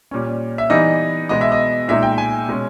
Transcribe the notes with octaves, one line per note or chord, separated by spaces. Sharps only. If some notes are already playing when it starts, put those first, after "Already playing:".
A#2 G3 C#4
E5
E3 G3 B3 D#4 D#5
B2 G#3 B3 D#5
E5
D#5
A#2 G#3 D#4 E5
G5
G#5
B2 G#3 C#4